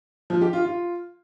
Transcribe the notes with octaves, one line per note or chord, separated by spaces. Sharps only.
F3
G4
F4
F4